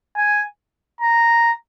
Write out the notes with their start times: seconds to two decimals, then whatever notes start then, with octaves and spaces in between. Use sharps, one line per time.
0.17 G#5
1.01 A#5